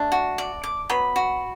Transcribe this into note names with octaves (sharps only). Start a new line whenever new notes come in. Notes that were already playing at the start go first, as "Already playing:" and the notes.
Already playing: A3 D4
F#4
D5
D6
F#3 B3 B5
F#4